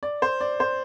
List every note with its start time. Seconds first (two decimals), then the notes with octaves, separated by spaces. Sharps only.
0.03 D5
0.22 C5
0.41 D5
0.60 C5